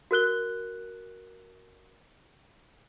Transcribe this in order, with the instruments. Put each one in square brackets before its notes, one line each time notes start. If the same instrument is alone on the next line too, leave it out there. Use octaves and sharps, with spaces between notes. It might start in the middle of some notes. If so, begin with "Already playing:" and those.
[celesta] F#4 A#4 F#6 G7